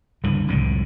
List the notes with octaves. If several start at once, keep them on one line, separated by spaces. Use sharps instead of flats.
C#2 G2 D3 E3
C2 F2 A2 D3